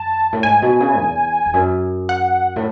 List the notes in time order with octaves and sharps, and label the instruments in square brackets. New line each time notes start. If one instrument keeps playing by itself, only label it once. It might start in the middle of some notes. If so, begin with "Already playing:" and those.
Already playing: [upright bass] F#2 [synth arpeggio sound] A5
[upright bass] A2
[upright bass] G#2 [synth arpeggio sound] G#5
[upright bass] B2
C#3
E2
E2
F#2
[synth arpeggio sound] F#5
[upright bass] A2